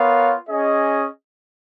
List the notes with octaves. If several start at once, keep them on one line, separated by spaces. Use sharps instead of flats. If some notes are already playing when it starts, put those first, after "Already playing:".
Already playing: B3 F4 A#4 C#5 F5
C#4 G#4 D#5